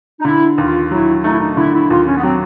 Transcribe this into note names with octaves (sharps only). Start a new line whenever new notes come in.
D#4
D3 E4
D#2 F4
F#3 E4
A3 D#4
E4
D#4
D3 E4
E4
D#2 F4
C#4
B3
F#3 C4